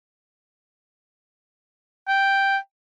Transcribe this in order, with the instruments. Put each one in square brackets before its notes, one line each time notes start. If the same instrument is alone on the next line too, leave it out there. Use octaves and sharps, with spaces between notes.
[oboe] G5